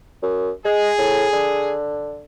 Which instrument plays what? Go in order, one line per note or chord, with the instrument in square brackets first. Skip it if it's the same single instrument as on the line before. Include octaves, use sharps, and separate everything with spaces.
[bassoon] F#2
[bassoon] G#3 [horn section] G#4
[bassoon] A2
D3